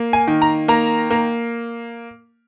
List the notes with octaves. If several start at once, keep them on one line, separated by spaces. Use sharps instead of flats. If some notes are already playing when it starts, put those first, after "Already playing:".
Already playing: A#3
G#5
D#3
A#5
A#3 A#5
A#3